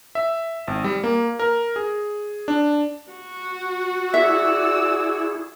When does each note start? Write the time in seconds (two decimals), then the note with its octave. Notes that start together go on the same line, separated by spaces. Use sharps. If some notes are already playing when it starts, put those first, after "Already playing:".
0.15 E5
0.67 G#1
0.84 G3
1.04 A#3
1.39 A#4
1.76 G#4
2.48 D4
3.12 F#4
4.14 E4 G#4 D5 E5 E6